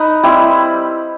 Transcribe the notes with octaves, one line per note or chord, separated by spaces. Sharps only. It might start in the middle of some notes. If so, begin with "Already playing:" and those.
Already playing: D#4 B4
G3 C4 E4 G4